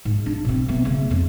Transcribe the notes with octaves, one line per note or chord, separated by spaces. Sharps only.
G#2
D4
B2 C4
A3 B3
C#3 A3
F2 D3